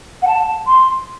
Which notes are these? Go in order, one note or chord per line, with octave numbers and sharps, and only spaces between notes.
F#5
A5
C6